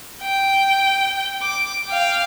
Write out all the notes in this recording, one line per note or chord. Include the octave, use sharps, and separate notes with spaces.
G5
D6
F5 G5